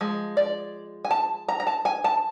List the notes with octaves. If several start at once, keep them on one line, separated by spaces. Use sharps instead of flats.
F3 G#3
D5
G#5
A5
A#5
A#5
A5
G#5
A5